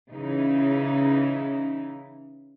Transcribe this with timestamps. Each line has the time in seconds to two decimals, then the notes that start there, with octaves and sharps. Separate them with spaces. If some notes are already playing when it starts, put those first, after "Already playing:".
0.11 C#3 E3 D#4